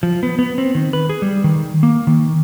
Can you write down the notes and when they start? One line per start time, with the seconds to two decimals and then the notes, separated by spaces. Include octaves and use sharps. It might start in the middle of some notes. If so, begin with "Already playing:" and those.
0.03 F3
0.23 B3
0.39 B3
0.58 C4
0.75 D#3
0.93 B4
1.09 G#4
1.22 G3
1.44 D#3
1.83 A#3
2.07 D#3